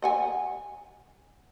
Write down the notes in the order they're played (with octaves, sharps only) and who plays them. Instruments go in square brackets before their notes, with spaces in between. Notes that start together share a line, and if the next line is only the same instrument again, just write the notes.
[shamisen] D#5 F#5 G#5